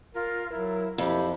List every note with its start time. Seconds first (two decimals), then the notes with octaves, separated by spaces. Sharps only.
0.15 F4 A#4
0.51 F#3 E4 A#4
0.98 F2 E4 G4 B5